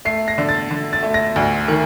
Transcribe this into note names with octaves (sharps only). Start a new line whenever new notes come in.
A3 C7
A#6
D3
A6
D3
A6
A3
A#6
D2
D#3